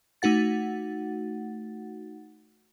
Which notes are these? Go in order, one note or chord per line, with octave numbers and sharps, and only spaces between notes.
A3 D#4 F#4 F#5 A6